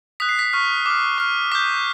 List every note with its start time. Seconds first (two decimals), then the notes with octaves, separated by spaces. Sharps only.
0.20 D#6 F#6 B6
0.29 C7
0.39 B6
0.53 C#6 F6
0.86 D6 F6
1.18 C#6 F6
1.52 D6 G6 B6